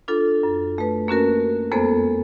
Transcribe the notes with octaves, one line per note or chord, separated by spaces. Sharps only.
D4 F4 A4
F#2
A3 B4
A#3 C#4 F#4 A#4
F2 G#3 A#3 B3 A4 C5